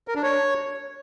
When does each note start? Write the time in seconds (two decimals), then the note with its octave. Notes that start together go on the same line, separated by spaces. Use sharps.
0.08 A#4
0.16 D4
0.23 C#5